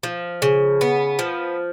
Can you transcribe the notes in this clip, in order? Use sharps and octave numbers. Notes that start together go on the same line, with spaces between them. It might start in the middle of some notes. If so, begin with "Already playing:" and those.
F3
C#3
B3
F3